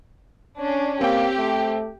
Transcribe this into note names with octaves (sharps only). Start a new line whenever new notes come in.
C#4 D4
A#3 C4 G4 G5
A3